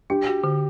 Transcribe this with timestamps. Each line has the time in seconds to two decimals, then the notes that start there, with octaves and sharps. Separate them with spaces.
0.10 D4 G4
0.27 F#4
0.44 D3